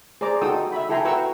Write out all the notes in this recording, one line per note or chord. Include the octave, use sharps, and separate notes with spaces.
G#4 C5 D5 A#5 D6
D#4 F#4 A4 G5 D#6 E6
E5 B5
E4 A4 G5 G#5 A#5 C6
F#4 B4 G5 A#5 C#6 E6